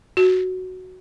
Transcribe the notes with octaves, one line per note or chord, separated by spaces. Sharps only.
F#4